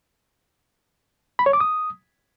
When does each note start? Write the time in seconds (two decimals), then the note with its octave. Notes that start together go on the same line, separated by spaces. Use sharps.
1.39 B5
1.46 C#5
1.53 D6
1.61 D#6